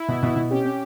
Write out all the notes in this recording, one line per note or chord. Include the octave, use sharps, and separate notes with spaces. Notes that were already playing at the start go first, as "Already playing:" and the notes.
Already playing: E4
B2
B2
B2
C#4 G4
C#4